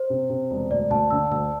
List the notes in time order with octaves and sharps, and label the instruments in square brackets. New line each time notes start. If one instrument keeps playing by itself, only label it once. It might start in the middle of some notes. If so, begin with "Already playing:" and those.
Already playing: [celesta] C5
[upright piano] C3
C3
E1
[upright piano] D2 [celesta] D5
[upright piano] D2 [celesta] A5
[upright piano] D3 [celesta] E6
[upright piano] D2 [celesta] E6